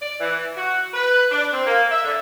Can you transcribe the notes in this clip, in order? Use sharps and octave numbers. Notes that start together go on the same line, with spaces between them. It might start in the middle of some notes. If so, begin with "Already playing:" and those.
D5
E3
F#4
B4
D4
C4
A#3
E5
D3